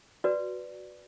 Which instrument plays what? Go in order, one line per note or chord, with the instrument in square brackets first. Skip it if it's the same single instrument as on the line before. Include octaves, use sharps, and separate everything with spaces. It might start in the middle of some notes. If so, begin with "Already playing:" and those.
[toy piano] F#4 B4 D5